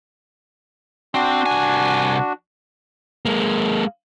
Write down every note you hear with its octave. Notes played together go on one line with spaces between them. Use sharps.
C4 D4 F#4
C2 G#5
G#3 A#3